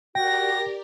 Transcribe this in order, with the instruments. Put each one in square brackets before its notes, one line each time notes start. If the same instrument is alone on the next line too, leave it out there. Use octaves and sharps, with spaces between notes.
[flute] F#4 [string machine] G4 A#4 D5 [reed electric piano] G5 [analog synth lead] A#6